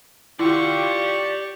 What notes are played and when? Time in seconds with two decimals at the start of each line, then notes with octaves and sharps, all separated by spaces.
0.39 E4 F4 G4 D5 F#5 G5 C#6